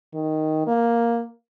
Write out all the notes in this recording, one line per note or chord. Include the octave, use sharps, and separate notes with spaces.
D#3
A#3